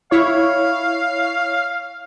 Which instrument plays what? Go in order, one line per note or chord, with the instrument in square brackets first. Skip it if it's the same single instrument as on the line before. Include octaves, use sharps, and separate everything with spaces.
[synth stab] E4 C#5 [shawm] F5